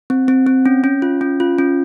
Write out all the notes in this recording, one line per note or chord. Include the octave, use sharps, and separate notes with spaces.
C4
C4
C4
C#4
C#4
F4
C#4
F4
C#4